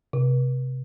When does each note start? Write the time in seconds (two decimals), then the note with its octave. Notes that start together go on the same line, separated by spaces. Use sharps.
0.13 C3